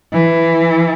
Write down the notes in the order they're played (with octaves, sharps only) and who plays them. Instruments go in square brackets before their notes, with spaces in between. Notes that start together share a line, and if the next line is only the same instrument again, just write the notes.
[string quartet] E3